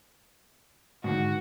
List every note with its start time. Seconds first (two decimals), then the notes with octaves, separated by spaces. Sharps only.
1.04 G#2 D3 D#3 F#4